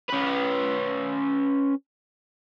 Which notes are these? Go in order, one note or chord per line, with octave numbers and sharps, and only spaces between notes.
C#4 B4